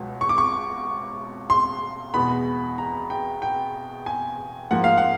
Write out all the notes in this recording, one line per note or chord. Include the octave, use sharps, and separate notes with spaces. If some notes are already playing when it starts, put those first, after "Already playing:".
Already playing: C#2 B2 F#3 B3
C#6
D6
C#6
C6
E2 B2 G#3 B3 B5
A#5
G5
G5
G#5
G#2 F3 A#3 F#5
F5
F#5